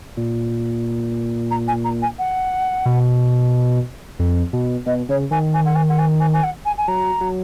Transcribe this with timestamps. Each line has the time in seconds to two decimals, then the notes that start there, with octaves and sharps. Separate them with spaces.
0.17 A#2
1.51 A#5
1.68 G#5
1.84 A#5
2.02 G#5
2.19 F#5
2.86 B2
4.19 F2
4.53 B2
4.86 B2 D#5
5.09 C#3 C#5
5.31 D#3 G#5
5.54 G#5
5.65 F#5
5.75 G#5
5.89 F#5
5.99 G#5
6.20 G#5
6.33 G#5
6.43 F#5
6.65 G#5
6.78 G#5
6.88 F#3 A#5
7.21 F#3